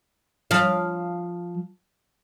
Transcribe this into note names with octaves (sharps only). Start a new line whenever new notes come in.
F3 F5